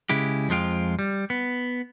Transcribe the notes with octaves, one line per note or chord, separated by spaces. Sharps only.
C#3 G#3 E4 G4
F2 F3 G#3 F4 G5
G3
B3